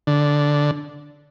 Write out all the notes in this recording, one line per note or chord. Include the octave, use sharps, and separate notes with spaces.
D3